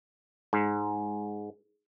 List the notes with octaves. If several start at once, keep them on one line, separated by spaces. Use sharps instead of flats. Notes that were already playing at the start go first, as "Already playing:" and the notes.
G#2